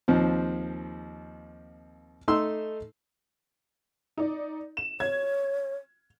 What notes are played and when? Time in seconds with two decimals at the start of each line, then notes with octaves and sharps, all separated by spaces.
0.08 D#2 F3 C4
2.28 A3 D#4 A4 C6 E6
4.18 D#4 D5
4.77 E7
5.00 C#5 G#6